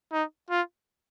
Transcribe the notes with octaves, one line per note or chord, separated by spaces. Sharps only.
D#4
F4